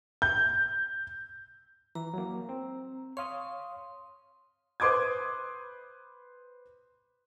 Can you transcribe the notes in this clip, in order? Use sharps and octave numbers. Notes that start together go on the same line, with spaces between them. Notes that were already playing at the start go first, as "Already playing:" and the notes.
G6
E3 A#5
F#3 A#3
C4
C#5 F5 C6 D#6
B4 C5 C6 D6 D#6 G#6